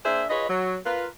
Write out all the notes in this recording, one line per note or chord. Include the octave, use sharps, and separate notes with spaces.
A#3 D4 G#4 A#4 C5 E5
F4 G#4 B4 C#5 D#5
F#3
F4 A#4 B4